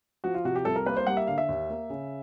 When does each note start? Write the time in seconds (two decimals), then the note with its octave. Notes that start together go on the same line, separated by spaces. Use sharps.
0.24 F3 F#4
0.34 F4
0.44 C3 F#4
0.56 G4
0.65 C2 A4
0.76 A#4
0.86 A#3 B4
0.97 C5
1.07 G3 F#5
1.17 E5
1.27 D3 F5
1.38 E5
1.49 D#2
1.70 A#3
1.90 C#3